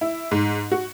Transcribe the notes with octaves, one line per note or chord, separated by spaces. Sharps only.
E4
G#2
F#4